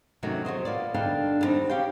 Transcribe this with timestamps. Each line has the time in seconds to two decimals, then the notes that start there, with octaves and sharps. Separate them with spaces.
0.23 C3 D#3 F#3 A3 C#4
0.45 F#3 F#4 C5 D#5
0.65 A#3 B3 F4 D5
0.94 G2 D3 D4 D#4 F5 G5
1.41 D3 D#3 G3 C4 D#4
1.70 C#4 G4 F5 G5